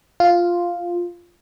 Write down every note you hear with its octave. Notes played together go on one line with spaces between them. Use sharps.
F4